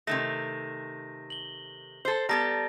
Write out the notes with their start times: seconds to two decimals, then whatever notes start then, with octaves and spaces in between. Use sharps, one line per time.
0.07 C3 D#3 A3 A#6
1.30 F#7 G7
2.05 A4 C5
2.29 G3 B3 A4 A5 A#5 A#6